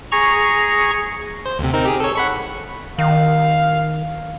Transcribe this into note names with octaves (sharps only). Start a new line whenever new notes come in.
G#4 A#5 C#6
C5
D2 C3
C4 D#4 A#4
G4 G#4
A4 C#5
F#5 B5 C#6
D#3 F5